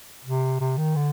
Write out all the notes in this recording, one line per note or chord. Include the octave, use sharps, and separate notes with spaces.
C3
C3
D#3
D3